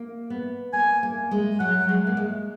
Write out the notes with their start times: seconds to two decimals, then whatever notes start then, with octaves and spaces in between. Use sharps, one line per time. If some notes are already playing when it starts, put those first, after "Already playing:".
Already playing: A#3
0.30 B3
0.73 A#3 G#5
1.03 A#3
1.31 G#3
1.60 F#3 F#5
1.89 G#3
2.07 A#3
2.17 G#3